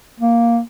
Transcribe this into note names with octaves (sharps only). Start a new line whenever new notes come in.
A#3